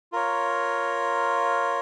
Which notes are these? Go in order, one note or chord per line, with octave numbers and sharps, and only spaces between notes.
F4 A#4 C#5